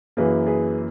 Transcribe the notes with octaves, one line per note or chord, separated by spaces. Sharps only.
F#2 E3 A#3 G#4 B4
G#4 B4